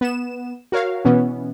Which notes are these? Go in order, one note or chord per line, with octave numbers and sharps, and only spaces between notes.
B3 E7
F#4 A#4 C#5 F5
B2 E3 B3 C#4